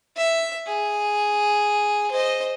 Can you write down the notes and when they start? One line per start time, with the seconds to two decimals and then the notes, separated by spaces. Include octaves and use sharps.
0.16 E5
0.67 G#4
2.11 C5 D#5